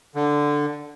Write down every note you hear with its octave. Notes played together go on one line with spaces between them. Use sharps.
D3